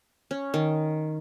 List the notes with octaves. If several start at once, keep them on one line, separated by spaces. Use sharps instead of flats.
C#4
D#3